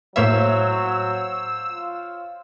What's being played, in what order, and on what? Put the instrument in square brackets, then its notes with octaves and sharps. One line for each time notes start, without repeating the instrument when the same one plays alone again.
[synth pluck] A2 A#3 E5 [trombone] F#3 [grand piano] C5 C#5 F5 [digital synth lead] E6
[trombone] F4